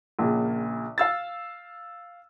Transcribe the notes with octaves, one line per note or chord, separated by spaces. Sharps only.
A#1 A#2 C#3
F5 E6 A6